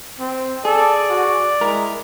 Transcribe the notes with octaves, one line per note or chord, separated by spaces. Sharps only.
C4
G#4 A4 D5
F#4
G#3 E4 A#4